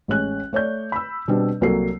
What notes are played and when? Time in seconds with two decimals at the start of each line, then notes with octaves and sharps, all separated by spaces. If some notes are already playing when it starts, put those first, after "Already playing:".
0.08 A1 G#3 C#4 F#6
0.53 A3 C#5 D5 G6
0.92 B5 E6
1.28 B2 G3 C4 D4
1.61 C2 F#3 A#3 A4 C7